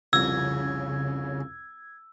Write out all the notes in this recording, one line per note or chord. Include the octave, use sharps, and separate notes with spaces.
C2 F2 C#3 E6 G#6